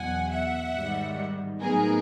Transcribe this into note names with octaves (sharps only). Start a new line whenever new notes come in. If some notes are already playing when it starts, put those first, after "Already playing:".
Already playing: E2 B2 F#3 F#5 G#5
E5 F#5
G#2 D#3 G3
A2 F#3 B3 D#4 G#4 A#4